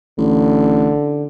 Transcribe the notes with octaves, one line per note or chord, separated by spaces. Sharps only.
A1 D3